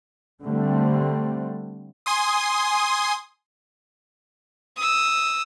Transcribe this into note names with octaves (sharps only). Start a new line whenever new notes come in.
D3 G3 A3 C4
G#5 C6 D#6
D#6 E6